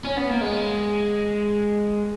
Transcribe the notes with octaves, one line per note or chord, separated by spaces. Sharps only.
C#4
B3
A#3
G#3